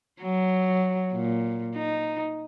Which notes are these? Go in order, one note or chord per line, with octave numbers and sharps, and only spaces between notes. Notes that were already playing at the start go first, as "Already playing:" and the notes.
F#3
A#2
D#4